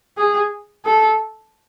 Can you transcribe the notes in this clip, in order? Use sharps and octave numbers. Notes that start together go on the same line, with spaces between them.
G#4
A4